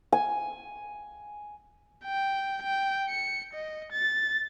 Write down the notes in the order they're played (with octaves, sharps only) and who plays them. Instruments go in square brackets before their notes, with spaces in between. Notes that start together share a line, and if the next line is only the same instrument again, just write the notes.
[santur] G#5
[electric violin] G5
G5
C#7
D#5
A6